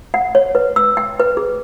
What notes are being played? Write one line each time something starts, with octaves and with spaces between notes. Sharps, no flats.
F#5
C#5
B4
E6
G5
B4
G#4